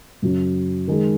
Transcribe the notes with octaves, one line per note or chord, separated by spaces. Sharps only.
F#2 C#3 F#3 C#4
D#3 G#3 D#4 G#4